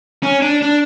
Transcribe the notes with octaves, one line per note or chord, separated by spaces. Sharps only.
C#4
D4
D4